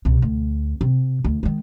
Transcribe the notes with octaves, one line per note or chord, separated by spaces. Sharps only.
C2 B2
D2
C3
D2
D#3 G#3